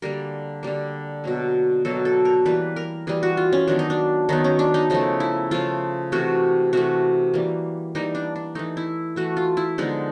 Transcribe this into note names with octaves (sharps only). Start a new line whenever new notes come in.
D3 G3 A#3 A#4
D3 G3 A#3
B2 F#3 A#3
B2 F#3 A#3 A4
A4
A#4
E3 G3 A#3 B4
A#4
E3 G3 A#3 G#4
F#4
F4
C#4
D#3 F#3 B3 D4
D#4
D4
D#3 F#3 B3 D#4
C#4
D4
D#4
C#3 F3 A3 D#4
E4
C#3 F3 A3 F4
C3 E3 A3 F#4
C3 E3 A3 F#4
E3 G3 A#3
E3 G3 A#3 D#4
D4
D4
E3 A3 D#4
E4
E3 A3 F#4
F4
E4
D3 F3 G#3 B3 D#4